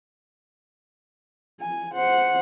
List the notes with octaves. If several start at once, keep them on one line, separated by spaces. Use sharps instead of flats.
G#5
C5 F#5